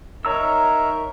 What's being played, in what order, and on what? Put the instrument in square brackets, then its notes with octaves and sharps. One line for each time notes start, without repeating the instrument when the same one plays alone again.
[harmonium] D#4 A#4 E5 [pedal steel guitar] C#5 A#5 E6